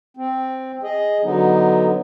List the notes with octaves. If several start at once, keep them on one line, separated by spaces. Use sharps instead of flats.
C4
G#4 D#5
D3 F#3 B3 D#4